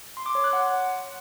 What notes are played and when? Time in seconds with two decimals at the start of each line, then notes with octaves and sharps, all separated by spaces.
0.17 C6
0.26 D6
0.35 C#5
0.44 F#6
0.53 F#5